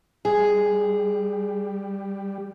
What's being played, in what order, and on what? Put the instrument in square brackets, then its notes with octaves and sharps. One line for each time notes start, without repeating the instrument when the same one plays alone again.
[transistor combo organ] G3 [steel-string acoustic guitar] G#4